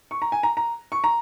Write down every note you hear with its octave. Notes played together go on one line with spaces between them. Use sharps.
C#6
A#5
G#5
A#5
A#5
C#6
A#5